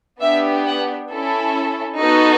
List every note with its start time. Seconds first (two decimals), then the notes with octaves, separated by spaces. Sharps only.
0.21 B3 D4 G4 E5
0.65 F#5
1.09 C#4 E4 A4
1.98 B3 D#4 F#4 A4